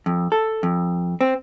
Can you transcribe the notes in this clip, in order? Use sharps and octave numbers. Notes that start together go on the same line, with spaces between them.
F2
A4
F2
C4